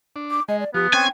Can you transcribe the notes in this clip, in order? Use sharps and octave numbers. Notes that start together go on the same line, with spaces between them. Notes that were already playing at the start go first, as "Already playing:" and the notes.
D4
D6
G#3 D#5
D5
F3 B3 G4
C4 C#4 G5 G#5